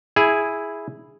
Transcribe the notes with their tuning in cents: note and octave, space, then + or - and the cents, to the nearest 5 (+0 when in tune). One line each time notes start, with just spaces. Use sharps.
E4 +0 G#4 +0